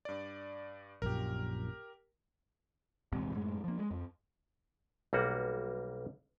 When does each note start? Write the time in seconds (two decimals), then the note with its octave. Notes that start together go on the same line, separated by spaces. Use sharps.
0.05 G2 D5
1.02 A#1 F#2 A#2 G4 A#4
3.12 A#1 E2 G#2 C3
3.34 F#2 A2 G#3
3.64 F3 A#3
3.79 G#3
3.91 F2
5.13 B1 G3 A#3 F#4